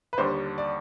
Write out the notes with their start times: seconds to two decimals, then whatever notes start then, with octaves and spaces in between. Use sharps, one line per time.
0.13 B4
0.18 D#2 D3 G3 D4 C5
0.58 D5